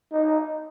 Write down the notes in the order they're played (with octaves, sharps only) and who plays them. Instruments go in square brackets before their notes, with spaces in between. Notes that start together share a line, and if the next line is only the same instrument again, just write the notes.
[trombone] D#4